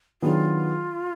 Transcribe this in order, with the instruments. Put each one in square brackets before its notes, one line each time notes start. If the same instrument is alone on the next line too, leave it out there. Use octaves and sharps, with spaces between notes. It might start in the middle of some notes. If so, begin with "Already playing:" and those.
[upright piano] D#3 F#3 B3 D4 G#4 [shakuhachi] F4